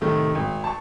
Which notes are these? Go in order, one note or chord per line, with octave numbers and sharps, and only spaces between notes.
A2 C3 D#3 A3
G#1
A5 C#6